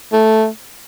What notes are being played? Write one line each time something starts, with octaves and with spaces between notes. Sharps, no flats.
A3